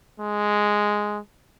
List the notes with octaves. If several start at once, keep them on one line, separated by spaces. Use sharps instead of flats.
G#3